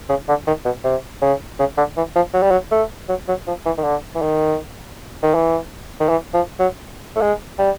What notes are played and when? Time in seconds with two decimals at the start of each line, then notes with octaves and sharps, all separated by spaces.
0.09 C#3
0.28 D3
0.47 D#3
0.65 B2
0.84 C3
1.22 C#3
1.59 C#3
1.77 D3
1.97 E3
2.16 F3
2.34 F#3
2.42 G3
2.51 F#3
2.71 A3
3.09 F#3
3.28 F#3
3.47 F3
3.66 E3
3.78 D#3
3.84 D3
4.15 E3
4.22 D#3
5.23 D#3
5.34 E3
6.00 D#3
6.09 E3
6.34 F3
6.59 F#3
7.16 A3
7.21 G#3
7.59 G3